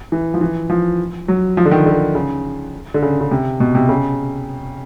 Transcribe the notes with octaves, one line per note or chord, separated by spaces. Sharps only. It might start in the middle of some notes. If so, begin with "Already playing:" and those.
E3
F3
E3
F3
F#3
F3
D3
D#3
D3
C#3
D3
C#3
C#3
C3
B2
C3
C#3